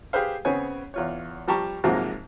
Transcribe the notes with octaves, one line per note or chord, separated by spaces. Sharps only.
G4 G#4 B4 C5 F5
C#3 B3 C4 C#5 G#5
E2 F4 C#5
F3 G3 G4 A5 A#5 C#6
G#2 C3 F3 F#3 G#3 A#3